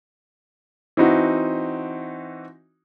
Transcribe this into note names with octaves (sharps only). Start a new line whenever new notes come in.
E3 C4 D#4 F#4